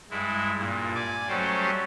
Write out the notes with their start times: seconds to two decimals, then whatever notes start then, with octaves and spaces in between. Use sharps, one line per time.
0.10 G2 G#3 E4
0.57 G2 A#2
0.95 D5 G#5 D6
1.29 F#3 G3 A3 C#4 G4 C5